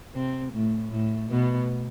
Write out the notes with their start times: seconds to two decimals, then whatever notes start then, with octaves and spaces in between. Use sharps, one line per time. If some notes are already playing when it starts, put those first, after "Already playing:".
0.15 C3 C4
0.53 A2 A3
0.91 A2 A3
1.30 B2 B3